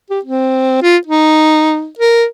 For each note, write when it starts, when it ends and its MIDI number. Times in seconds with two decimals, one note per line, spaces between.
0.10 0.19 67
0.25 0.82 60
0.82 0.97 65
1.07 1.88 63
1.99 2.25 70